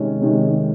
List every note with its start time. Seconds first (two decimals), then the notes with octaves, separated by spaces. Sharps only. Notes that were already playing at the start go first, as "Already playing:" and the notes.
Already playing: C3 D#3 G#3 C#4
0.21 C3 D#3 G#3